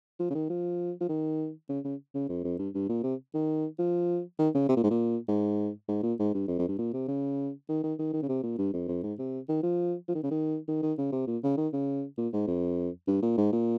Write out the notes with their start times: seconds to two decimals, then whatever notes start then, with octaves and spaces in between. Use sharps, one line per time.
0.20 F3
0.30 C#3
0.35 D#3
0.50 F3
1.01 F3
1.09 D#3
1.69 C#3
1.85 C#3
2.14 C#3
2.29 F2
2.44 F2
2.59 G2
2.75 G2
2.89 A#2
3.04 C3
3.35 D#3
3.79 F3
4.39 D#3
4.55 C#3
4.69 C3
4.77 A#2
4.83 G#2
4.90 A#2
5.28 G#2
5.88 G#2
6.03 A#2
6.19 G#2
6.34 G2
6.48 F2
6.59 F2
6.68 G2
6.78 A#2
6.93 C3
7.08 C#3
7.69 D#3
7.83 D#3
7.99 D#3
8.13 D#3
8.23 C#3
8.29 C3
8.43 A#2
8.58 G2
8.73 F2
8.88 F2
9.03 G#2
9.19 C3
9.49 D#3
9.63 F3
10.08 F3
10.15 D#3
10.23 C#3
10.31 D#3
10.68 D#3
10.82 D#3
10.98 C#3
11.12 C3
11.27 A#2
11.43 C#3
11.57 D#3
11.73 C#3
12.18 A#2
12.33 G#2
12.47 F2
13.08 G2
13.22 A#2
13.38 G#2
13.53 A#2